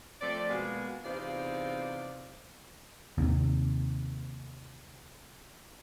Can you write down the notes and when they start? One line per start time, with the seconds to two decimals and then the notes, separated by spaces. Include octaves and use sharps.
0.21 F3 A3 C4 D5
0.50 B2 G#3 A#3 F4 F#4 G#4
1.05 E2 C3 D#4 F4 C5 D5
3.18 D#2 C3